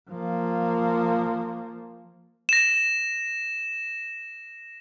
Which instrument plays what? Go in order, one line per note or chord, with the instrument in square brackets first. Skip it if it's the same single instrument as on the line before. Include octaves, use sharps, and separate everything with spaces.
[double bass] F3 A#3
[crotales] A#6 E7